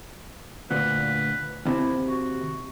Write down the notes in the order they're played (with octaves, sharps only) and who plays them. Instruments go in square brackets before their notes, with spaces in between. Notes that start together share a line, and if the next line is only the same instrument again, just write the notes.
[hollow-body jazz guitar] D2 A#2 [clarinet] B4
[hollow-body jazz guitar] D#2 C3 [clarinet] E4
[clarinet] F#4